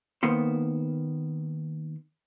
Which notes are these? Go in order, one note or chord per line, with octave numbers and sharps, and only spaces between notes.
D#3 A#3 B3 C5